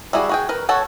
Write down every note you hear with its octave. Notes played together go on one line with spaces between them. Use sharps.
G3 E4 F#4 G#4
F#4 G#4 G5
A#4 B4
F#4 A4 C#5 F#5 A5